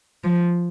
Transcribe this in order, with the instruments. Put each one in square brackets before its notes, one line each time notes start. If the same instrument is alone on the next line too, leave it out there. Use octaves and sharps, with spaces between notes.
[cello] F3